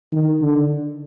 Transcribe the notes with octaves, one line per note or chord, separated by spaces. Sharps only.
D#3
D3